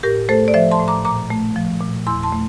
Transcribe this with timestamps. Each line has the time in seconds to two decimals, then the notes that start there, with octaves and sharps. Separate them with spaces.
0.03 A2 G4 A#4
0.29 A3 A4 C5
0.48 D5
0.54 F3 C5 E5
0.71 A5 C6
0.80 A2
0.88 A#5 D6
1.05 A#2 A#5 D6
1.30 A3
1.56 F3
1.81 A#2
2.06 E2 C6 E6
2.23 A5 C6
2.32 A3